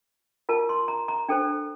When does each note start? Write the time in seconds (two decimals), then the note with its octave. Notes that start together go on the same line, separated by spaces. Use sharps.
0.49 F4 A#4 A5
0.69 C6
0.88 A#5
1.08 A#5
1.29 D4 A4 C5 G5